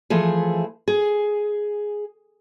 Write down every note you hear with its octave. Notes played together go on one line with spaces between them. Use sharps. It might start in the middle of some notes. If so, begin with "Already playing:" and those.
E3 F3 A3 G#4
G#4